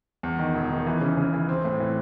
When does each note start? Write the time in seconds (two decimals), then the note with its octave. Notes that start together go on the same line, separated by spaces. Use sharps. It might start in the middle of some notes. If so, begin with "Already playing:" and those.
0.23 E2
0.39 D#3
0.55 E1
0.71 D#3
0.86 E3
1.01 C#3
1.17 C#3
1.34 E3
1.49 C4
1.65 A2
1.80 E3